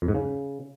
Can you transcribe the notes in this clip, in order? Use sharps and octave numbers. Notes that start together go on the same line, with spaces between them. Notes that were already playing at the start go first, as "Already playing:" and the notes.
F2
G#2
C#3